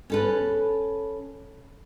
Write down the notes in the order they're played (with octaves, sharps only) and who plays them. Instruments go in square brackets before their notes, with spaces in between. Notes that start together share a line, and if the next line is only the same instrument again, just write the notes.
[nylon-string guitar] C#4 A4 B4